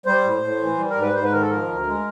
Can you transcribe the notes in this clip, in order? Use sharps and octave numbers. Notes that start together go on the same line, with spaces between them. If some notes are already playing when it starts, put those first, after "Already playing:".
G3 C5
A2
A2
E3
G3
A#4
G#2
B4
G#2 C5
B4
D#3 A#4
A4
F3 A#4
D2
G#3